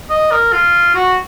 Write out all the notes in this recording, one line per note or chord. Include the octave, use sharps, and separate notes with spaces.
D#5
A#4
F4
F#4